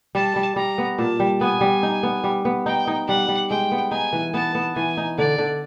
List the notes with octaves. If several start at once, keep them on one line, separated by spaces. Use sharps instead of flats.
G3 A5
G3
G3 A#5
B3
A#2 A5
G3
B3 G#5
G3
D#4
B3
G3
B3
D#4 G5
D#4
G3 F#5
G3
G#3 G5
B3
D#4 G#5
E3
B3 A5
B3
E3 G#5
D#4
D3 D5
D3